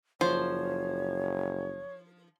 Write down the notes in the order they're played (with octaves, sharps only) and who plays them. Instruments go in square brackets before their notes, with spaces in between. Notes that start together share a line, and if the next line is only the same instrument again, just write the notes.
[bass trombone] F#1 [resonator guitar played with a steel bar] F3 [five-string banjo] C5 [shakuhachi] C#5